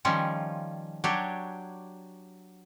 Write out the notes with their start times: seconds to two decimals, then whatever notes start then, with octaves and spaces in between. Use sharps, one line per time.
0.05 D#3 F3 G3 C#4 F4
1.04 F#3 D4 G4 C#5